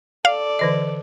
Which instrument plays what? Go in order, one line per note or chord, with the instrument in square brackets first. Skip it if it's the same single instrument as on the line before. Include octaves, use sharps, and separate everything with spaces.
[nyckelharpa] A4 D5 [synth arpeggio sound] F5
[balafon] D3 E3 D#5